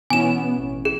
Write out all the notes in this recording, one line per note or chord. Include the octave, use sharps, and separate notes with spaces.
B2 E3 B3 C#4 G#5 E7
A1
G#4